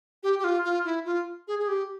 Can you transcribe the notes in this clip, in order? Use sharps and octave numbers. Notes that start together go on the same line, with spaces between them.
G4
G4
F4
F4
E4
F4
G#4
G#4
G4